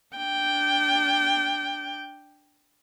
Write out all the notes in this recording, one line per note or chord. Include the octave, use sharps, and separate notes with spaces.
D4 G5